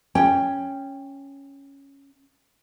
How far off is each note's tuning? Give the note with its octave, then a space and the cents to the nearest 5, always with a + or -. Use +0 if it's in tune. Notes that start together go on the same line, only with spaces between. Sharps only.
C#4 +0 G5 +15